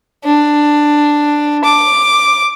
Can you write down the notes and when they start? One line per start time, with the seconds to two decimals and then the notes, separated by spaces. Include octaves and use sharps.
0.24 D4
1.64 D6